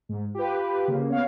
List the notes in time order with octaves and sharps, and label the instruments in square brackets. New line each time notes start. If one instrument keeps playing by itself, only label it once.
[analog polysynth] G#2
[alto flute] F4 [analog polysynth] G4 B4
[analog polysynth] C#3 A#3
[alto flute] B3 [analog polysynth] C#5 F5